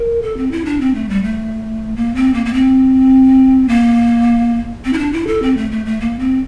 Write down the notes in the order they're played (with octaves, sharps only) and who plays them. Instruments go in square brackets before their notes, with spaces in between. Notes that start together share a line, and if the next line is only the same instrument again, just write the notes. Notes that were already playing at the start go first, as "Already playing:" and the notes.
Already playing: [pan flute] A#4
A4
C4
E4
D4
C4
A3
G3
A3
A#3
C4
A#3
A#3
C4
A#3
C4
E4
D4
E4
A4
C4
A3
A3
A3
A#3
C4